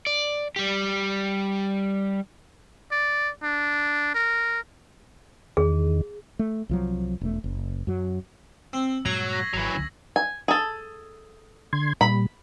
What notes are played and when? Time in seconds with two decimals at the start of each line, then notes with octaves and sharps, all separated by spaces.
0.07 D5
0.56 G3 G4
2.92 D5
3.43 D4
4.15 A#4
5.57 E2 D#3 G#4
6.39 A3
6.69 C2 F3 F#3
7.21 E1 A3
7.44 F#1
7.87 F#2 F#3
8.73 C4 E6
9.06 G2 A#2 F#3 G#3 A#5 G#6 C7 F#7
9.31 C#6 A#6 B6
9.53 G#1 E3 F#3
9.75 C#2 D3 C#4
10.16 G#5
10.48 G#4 A4
11.73 D3 C6 G#6
12.01 A#2 G3 B5